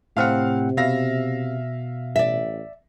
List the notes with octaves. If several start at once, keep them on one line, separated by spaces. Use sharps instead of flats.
A2 C3 C4 F5 F#5 F6
B2 E5 F5 A#6
A1 D5 E5